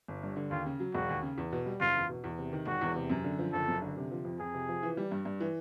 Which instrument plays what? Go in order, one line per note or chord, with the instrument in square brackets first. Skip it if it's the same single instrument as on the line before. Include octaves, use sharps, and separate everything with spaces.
[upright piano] G1
G2
D3
[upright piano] D#2 [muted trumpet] F4
[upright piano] C#3
F#3
[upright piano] E1 [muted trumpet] F#4
[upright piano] D#2
C#3
E2
B2
G3
[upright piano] F#1 [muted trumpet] F4
[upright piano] E2
B2
E2
C3
D#3
[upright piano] E1 [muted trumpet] F#4
[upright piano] E2
C3
F#2
D3
F3
[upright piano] F#1 [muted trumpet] A4
[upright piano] F#2
D3
C3
F3
F2
[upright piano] F2 [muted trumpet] G#4
[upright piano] C3
F3
E3
G3
G2
G2
E3